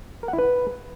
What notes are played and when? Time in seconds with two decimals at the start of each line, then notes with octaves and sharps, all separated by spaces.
0.23 A#4
0.28 F#5
0.33 E4
0.38 B4